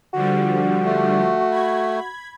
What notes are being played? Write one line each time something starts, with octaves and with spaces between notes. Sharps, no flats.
D3 F3 G3 F#4
A3
B5 G#6